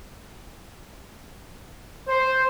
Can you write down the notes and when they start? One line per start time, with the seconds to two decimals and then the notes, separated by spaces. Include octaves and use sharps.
2.07 C5